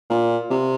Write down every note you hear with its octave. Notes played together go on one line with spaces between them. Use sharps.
A#2
C3